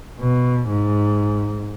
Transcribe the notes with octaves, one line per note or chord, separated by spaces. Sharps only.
B2
G#2